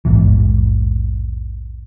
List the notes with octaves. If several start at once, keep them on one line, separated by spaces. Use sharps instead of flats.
A#1 E2 G#2 E3